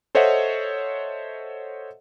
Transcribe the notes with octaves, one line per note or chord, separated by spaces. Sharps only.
A4 C5 C#5 D#5 E5 F#5